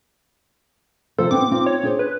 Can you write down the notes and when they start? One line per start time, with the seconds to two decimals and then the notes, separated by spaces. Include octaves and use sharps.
1.19 C3 F3 A4 C5
1.31 B3 C4 D4 D6
1.51 C4 D#4 F4
1.66 C#5
1.83 D4 G#4 C5
1.99 B4